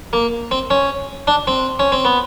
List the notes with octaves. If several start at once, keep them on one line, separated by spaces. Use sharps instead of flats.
A#3
C4
C#4
D4
C4
C#4
C4
B3